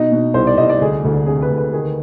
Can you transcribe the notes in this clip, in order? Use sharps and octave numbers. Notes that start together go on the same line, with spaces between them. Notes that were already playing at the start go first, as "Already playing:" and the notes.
Already playing: B2 D#4
B2
C2 C5
D5
C2 D#5
D5
D2 G#4
D2
C3 G#4
B4
D2
B4
D#3 G#4